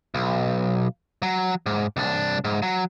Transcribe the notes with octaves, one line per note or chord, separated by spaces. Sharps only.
B1
F#3
G#2
C2 D4
G#2
F#3